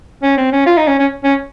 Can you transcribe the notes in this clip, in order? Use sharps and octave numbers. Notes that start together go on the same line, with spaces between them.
C#4
C4
C#4
F4
D#4
C#4
C#4
C#4